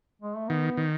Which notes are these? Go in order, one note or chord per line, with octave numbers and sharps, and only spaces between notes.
G#3
A3
D#3 B3
D#3